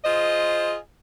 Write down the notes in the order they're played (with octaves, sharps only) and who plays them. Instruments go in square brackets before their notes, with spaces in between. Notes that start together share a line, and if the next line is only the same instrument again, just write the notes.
[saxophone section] F4 G#4 C5 D#5